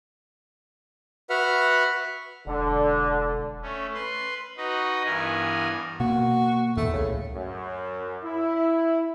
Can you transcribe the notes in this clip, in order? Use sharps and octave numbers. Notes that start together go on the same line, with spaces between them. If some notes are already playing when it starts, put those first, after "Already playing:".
F#4 B4 E5 F#5 F6
E1 D3
A3 C#4
B4 C6
D#4 F#4 B4 D#5
G2 E3 B3 A#4 G#5
B2 A#3 F#4
E2 A#2 D#3 A3
C#2 A2 C#3
F#2
E4